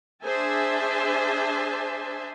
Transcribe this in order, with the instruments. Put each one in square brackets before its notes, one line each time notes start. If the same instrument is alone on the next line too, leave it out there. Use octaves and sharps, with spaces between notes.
[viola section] D4 G#4 C5 E5 G#5 A5